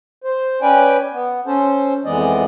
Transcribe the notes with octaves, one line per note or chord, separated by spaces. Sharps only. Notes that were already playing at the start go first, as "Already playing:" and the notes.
C5
C#4 B4 D5 G5 G#5
B3
C#4 A4 C5
F2 E3 G#3 B3 D5 D#5